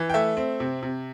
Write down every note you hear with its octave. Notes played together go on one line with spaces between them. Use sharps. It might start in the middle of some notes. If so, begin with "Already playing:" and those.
Already playing: E3
G5
A3 E5
C4
C3
C3